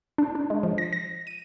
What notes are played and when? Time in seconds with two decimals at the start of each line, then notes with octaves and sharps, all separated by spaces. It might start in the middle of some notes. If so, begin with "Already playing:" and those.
0.18 D4
0.35 D4
0.50 G#3
0.63 F3
0.78 A#6
0.93 A#6
1.27 D#7